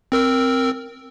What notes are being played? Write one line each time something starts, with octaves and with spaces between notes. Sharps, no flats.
C4 A#4 E6